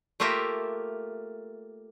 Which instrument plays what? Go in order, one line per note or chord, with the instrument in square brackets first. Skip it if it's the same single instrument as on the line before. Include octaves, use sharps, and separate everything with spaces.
[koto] A3 A#3 F4 G4 A#4 E5